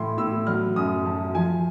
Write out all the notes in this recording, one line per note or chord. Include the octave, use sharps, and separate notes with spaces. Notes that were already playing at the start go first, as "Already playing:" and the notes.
Already playing: A2 E3 B5 C6
A2 E6
F#3 F6
F#2 D#6
F#2 A5
F3 G#5